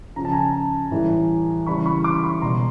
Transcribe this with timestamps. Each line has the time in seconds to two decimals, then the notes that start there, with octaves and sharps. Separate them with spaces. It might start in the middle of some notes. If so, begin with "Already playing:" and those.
0.16 C#3 F3 A#5
0.25 A5
0.32 G#5 A#5
0.91 A2 E3 G3
1.67 C#3 E3 G3 B5 C#6
1.86 B5 C#6
2.04 C6 D6
2.23 B5 C#6
2.42 B2 G3 A#5 C6